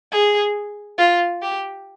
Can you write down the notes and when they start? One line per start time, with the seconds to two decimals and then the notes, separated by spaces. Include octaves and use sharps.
0.12 G#4
0.98 F4
1.42 G4